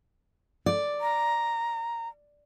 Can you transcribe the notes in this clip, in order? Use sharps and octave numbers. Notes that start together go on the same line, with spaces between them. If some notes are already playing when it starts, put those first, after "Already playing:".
D5
A#5